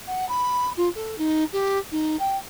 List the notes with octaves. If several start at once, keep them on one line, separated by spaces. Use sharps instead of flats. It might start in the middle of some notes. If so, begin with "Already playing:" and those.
F#5
B5
F4
A4
D#4
G4
D#4
G5